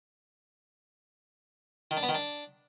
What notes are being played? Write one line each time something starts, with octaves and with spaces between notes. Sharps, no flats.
D#3
D4
B3
D#3
D4